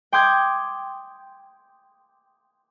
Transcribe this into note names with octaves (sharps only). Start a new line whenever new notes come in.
G5 C6 D6 D#6 G6 G#6